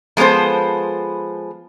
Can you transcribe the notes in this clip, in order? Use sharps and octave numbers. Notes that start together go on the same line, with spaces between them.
F3 G#3 B3 A4 C5